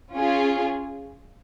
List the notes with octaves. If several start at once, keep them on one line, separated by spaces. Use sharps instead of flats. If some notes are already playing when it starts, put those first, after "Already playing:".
C#4 F4 G#4